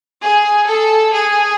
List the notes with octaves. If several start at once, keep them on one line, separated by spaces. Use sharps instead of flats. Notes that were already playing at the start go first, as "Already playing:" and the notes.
G#4
A4
G#4